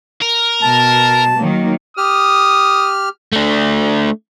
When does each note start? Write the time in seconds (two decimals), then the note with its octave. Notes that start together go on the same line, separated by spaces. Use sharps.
0.22 A#4
0.63 B2 A5
1.37 D#3 F#3 A#3
1.97 G4 D#6 F6
3.32 A3 D4